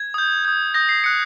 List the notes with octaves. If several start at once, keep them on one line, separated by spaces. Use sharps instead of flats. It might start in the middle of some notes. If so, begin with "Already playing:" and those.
Already playing: G#6
D#6 G6
D#6 G6
D#6 G6 A#6
C7
D#6 F#6 C#7